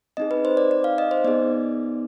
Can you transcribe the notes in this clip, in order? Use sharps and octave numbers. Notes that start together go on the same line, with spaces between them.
C4 D#4 G#4 D#5
B4
C5
D5
D5
F5
D#5
C5
B3 D#4 G#4 D5